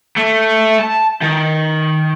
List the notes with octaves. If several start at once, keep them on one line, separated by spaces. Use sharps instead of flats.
A3
A5
D#3